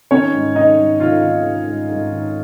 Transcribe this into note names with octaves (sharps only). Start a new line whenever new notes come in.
D#3 C#4 C#5
G#2
D#3 D#4 D#5
G#2
D#3 F4 F5
D#3
D#3
G#2
G#2
D#3